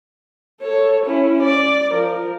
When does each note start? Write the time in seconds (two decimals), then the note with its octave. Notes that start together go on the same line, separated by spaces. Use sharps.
0.62 A4 C#5
1.05 C#4 E4
1.42 D5
1.92 F3 A#4